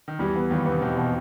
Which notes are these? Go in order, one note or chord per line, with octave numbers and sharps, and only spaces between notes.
D#3
E2 E3 G3
B3
D#2 D#3 G3
B3
C3
D#2 B2 D#3
B2